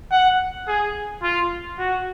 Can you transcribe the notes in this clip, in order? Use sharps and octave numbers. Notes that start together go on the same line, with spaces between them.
F#5
G#4
F4
F#4